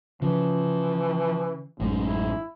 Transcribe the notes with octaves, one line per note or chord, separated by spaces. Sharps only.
C#3 E3 F3
A1 F#2 A2 G#3
E4